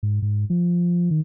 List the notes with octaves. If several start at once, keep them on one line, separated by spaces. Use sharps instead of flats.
G#2
G#2
F3
D#3